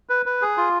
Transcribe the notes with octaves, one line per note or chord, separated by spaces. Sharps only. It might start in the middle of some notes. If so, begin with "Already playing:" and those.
B4
B4
G#4
F4